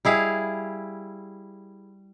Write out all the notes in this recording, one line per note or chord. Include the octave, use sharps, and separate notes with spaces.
G3 E4 G#4 F5